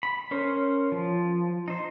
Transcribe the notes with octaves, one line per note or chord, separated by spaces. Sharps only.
B5
C#4 A#4 C5
F3
D#4 C5